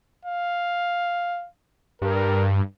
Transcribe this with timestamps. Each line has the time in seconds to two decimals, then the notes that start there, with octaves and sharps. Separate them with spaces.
0.25 F5
2.02 G2 A#4